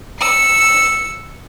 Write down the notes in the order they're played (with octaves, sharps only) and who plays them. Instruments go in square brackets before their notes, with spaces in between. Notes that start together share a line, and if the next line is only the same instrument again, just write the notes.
[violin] E6 C#7